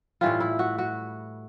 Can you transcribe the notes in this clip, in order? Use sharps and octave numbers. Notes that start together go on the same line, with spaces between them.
A2 E3 G3 F4
E4
F#4
F#4